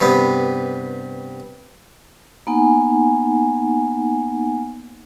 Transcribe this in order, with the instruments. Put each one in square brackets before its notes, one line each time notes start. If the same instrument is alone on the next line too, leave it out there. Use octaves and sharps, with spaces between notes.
[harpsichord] G2 C3 B3
[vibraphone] A#3 B3 D#4 F#5 G#5